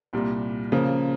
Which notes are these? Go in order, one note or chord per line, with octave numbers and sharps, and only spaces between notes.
C2 A#2 G3
C#3 F3 A#3